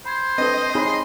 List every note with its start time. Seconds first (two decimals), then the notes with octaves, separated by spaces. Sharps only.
0.06 C5 B5 G#6
0.38 C4 D4 A4 B4 D#5
0.75 C4 D#4 G#4 C#5 G#5 B5 C6